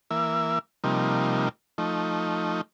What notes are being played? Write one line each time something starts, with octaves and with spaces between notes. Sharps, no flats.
E3 A#3 E5
C3 F3 G3 A#3 D#4
F3 A3 D#4